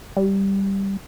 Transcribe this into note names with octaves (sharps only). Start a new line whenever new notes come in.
G3